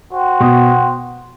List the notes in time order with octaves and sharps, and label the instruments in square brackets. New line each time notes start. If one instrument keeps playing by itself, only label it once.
[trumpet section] F#4 C5 G5
[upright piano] B2